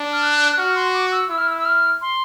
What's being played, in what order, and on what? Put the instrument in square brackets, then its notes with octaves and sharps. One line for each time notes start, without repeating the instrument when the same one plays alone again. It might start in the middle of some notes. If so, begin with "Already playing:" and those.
Already playing: [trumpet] D4
[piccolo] F6
F#6
F#6
[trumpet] F#4 [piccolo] F6
[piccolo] C6
D6
E6
[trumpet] E4 [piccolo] E6
[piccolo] F6
E6
E6
F6
C6